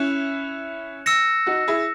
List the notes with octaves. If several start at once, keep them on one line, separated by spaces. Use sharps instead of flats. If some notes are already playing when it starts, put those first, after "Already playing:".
Already playing: C#4 E4 F#6 C#7 E7
E6 A#6 C#7 E7
D#4 F#4
E4 G#4